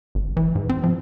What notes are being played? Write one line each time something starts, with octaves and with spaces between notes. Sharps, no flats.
G#1
E3
G#2
C4
F3